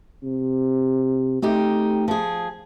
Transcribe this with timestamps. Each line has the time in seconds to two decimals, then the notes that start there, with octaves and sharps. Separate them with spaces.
0.23 C3
1.42 A3 C4 D#4 G4
2.08 F3 G#4